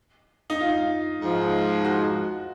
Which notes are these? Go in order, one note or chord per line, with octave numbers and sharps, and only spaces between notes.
D#4
F4
G#2 F3 G#3
F#4